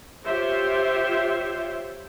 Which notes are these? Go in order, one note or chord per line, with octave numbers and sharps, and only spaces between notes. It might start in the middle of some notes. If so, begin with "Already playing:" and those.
F4 G4 C5 C#5 E5